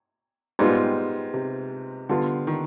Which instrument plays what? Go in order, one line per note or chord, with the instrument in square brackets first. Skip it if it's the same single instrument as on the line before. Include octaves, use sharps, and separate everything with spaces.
[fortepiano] G#2 G3 B3 F4
[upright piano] C3
[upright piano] D3 [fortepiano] G3 B3 F4
[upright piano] D#3